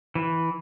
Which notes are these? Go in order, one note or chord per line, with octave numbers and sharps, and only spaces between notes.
E3